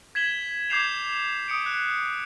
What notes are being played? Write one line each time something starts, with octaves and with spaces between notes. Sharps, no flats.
G#6 B6 E7 F#7 G7
D6 G6 G#6 C7 E7 F7
D#6 C#7 D7
F#6